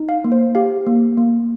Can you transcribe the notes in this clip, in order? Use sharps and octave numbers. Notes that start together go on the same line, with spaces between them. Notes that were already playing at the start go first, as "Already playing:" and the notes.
Already playing: D#4
F5
A#3
C5
G4 F5
A#3
A#3